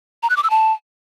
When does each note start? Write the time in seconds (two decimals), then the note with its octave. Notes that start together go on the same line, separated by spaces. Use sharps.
0.23 A#5
0.30 F#6
0.37 D6
0.43 E6
0.50 A5